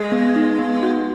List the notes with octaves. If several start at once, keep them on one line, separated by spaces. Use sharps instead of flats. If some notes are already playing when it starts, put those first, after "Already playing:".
Already playing: G#3
B3
D#4
B3
F#4